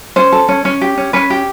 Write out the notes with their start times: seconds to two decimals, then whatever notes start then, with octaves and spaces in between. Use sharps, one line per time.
0.16 C#4 C5
0.32 A4
0.49 C#4
0.65 C#4
0.81 G4
0.97 C#4
1.13 C#4 B4
1.30 G4